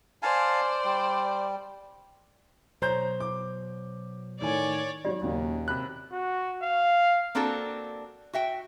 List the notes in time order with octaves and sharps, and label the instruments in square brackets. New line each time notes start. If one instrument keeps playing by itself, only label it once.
[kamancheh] C5 D5 [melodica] F5 G#5 A5
[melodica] G3
[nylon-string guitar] B2 F#3 C5 [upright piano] C#5 A#5 G6
[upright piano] D6
[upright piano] A2 D#3 G#5 [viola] C#5 D5
[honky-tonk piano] G#1 F#3 C#5 [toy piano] F4 G4 D5
[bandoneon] D#2 [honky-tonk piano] A#2 C#3 F#3
[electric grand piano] C3 B5 F#6
[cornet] F#4
F5
[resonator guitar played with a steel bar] A#3 C4 D4 F#4 A4
F#4 E5 G5